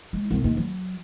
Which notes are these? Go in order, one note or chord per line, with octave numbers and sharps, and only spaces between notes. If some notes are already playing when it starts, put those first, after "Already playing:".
G#3
C2
D#2
F#3